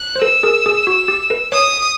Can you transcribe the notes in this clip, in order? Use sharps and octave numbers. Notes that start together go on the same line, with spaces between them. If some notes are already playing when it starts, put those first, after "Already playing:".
Already playing: F#6
C5
A4 B4 E6
G#4 A#4
G#4
F#4
G4
A4 B4
B4 C#5 D#6